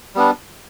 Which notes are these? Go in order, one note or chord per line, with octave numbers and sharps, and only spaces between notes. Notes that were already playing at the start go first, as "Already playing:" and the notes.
G3 B3 D4